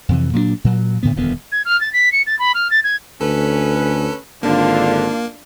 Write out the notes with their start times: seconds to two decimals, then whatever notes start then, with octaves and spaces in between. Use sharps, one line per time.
0.09 F2 C3 E3
0.33 A#2 F#3 C4 D4
0.64 A#2 F#3
1.03 A2 D3 B3
1.16 D#1 F2 D3 B3
1.52 G#6
1.65 F6
1.81 A6
1.93 B6
2.12 C#7
2.27 A6
2.39 B5
2.55 F6
2.71 A6
2.84 G#6
3.21 D2 C#4 A4 B4
4.43 G#1 D3 A#3 D4 F4